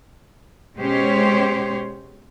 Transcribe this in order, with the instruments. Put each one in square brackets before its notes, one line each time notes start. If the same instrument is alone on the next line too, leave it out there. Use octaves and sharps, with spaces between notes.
[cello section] B2 G#3 C#4 G4 C5 C#5